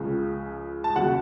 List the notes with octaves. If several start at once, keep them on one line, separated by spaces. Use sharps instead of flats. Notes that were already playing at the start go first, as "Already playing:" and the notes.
Already playing: C#2 C#3 F3
A5
D#2 C#3 F#3 F#5